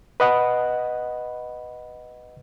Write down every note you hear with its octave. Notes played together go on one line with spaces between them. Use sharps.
B4 D#5 F#5 B5